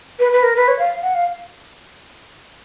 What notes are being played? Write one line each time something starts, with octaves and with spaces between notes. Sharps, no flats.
B4
B4
A#4
B4
C#5
F5
F#5
F5